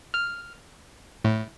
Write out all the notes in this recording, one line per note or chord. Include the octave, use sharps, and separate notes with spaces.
F6
A2